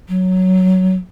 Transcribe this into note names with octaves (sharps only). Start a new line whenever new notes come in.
F#3